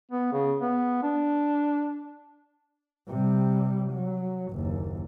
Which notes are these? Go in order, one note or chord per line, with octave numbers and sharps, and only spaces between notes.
B3
C#3
B3
D4
C3 G3
F#3
F#1 D#2